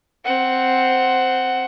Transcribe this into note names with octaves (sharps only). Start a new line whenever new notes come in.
C4 F#5